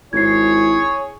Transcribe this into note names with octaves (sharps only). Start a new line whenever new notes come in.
G#1 E4 G#4 C#5 G#6 C7